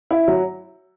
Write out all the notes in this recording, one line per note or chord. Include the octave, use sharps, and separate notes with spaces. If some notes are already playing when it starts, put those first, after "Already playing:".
E4
F#3